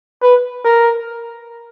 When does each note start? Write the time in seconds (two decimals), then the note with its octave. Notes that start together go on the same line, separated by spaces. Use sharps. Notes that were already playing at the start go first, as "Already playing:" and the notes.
0.22 B4
0.65 A#4